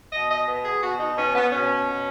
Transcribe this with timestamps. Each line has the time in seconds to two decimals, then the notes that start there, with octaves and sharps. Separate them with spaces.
0.13 B2 D#5
0.30 D#5
0.47 B3
0.65 G#4
0.83 B2 F#4
1.00 D#4
1.17 B3 C#4
1.36 B3
1.53 B2 C#4
1.87 B2